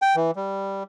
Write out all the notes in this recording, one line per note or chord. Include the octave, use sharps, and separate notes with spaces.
G5
E3
G3